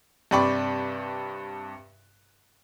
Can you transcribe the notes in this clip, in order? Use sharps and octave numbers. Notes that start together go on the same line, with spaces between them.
G2 C3 D5 G5 B5 C#6